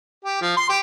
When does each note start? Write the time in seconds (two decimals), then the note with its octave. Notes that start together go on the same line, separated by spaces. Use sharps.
0.24 G4
0.41 F3
0.56 C6
0.69 G4